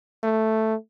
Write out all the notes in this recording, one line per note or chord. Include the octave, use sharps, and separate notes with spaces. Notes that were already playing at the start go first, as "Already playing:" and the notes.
A3